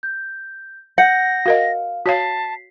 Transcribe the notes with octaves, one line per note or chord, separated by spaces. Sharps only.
G6
F#5 G6 A#6
F#4 A#4 D#5 F5
F#4 C#5 F5 A5 B6 C7